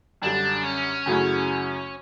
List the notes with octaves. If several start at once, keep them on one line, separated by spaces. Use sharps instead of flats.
F#2 D3 G3 D4
C#4
F#2 C#3 F#3 A3 E4